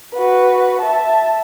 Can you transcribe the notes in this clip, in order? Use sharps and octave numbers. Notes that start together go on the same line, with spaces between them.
F#4 B4
E5 A5